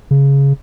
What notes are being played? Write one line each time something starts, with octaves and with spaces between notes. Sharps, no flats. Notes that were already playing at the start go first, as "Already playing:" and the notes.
C#3